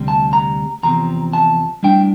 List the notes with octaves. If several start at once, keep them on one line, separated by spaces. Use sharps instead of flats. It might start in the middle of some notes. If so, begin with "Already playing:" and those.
Already playing: D2 C3 G3
A5
A#5
E2 C3 F3 C4 A#5
A5
A2 G3 D4 G5